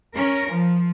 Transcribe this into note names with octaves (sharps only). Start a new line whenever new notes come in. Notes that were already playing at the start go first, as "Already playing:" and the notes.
C#4 A#4
F3